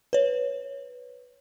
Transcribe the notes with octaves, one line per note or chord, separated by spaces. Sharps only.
B4 C#5